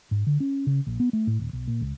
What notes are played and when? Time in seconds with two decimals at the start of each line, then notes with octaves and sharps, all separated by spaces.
0.11 G#2
0.27 D3
0.40 C#4
0.67 C#3
0.87 A#1
1.00 B3
1.13 A3
1.27 A2
1.39 D#1
1.53 B1
1.68 A#2
1.81 C#2